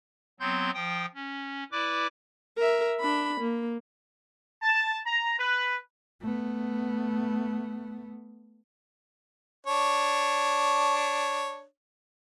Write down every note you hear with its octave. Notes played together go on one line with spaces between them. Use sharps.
F#3 B3 C4 C6 G6
F3 G5 D#6
C#4
E4 B4 D5 D6
A#4 E5
D4 B5
A#3
A5
A#5
B4
A3 B3
D4 C#5